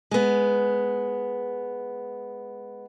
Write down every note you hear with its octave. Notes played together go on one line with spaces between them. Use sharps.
G#3 B3